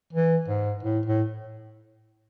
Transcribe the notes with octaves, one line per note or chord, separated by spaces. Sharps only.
E3
G#2
A2
A2